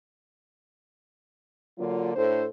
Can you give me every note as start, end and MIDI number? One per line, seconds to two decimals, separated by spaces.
1.79 2.15 50
1.79 2.15 54
1.79 2.15 58
1.79 2.15 62
1.79 2.15 65
2.16 2.45 45
2.16 2.45 62
2.16 2.45 69
2.16 2.45 72